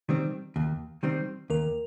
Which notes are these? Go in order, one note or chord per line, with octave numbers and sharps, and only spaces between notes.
D#3 G3 C4
D#2
D#3 G3 C4
D#2 A#4